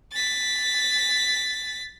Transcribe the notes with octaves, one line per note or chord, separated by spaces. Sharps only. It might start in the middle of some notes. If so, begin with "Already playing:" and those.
A6 B6